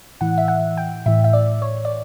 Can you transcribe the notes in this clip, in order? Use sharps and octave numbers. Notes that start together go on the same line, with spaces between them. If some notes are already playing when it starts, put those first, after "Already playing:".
A2 E3 F#5
E5
F#5
G5
A2 E3 E5
E5
D5
C#5
D5